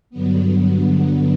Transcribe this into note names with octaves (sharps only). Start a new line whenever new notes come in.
G2 D3 F#3 B3